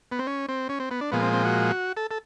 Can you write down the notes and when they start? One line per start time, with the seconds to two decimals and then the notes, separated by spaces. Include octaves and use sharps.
0.12 B3
0.19 C4
0.27 C#4
0.49 C4
0.69 C#4
0.80 C4
0.91 B3
1.01 D4
1.12 A#2 F3 G#3 B3
1.22 C4
1.33 C4
1.45 F#4
1.97 A4
2.11 A4